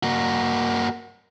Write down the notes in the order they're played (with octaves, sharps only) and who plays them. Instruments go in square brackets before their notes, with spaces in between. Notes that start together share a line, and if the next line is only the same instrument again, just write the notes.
[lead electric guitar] A#3 F#4